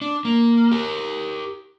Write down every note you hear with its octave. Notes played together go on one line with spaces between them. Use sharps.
D4
A#3
G4 A#4